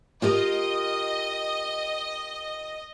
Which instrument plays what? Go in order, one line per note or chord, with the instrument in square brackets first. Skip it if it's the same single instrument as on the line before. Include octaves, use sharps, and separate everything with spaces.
[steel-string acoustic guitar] F4 G4 A#4 [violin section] D#5